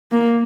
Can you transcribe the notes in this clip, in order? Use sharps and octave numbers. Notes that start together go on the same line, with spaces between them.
A#3